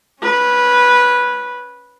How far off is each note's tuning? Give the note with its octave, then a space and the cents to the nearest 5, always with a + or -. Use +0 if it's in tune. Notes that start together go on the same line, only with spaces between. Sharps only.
C#4 +0 B4 -10